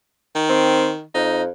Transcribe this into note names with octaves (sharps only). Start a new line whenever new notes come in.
D#3
C4
F2 D#4